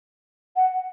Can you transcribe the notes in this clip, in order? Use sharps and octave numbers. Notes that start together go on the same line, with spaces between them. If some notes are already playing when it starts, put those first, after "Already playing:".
F#5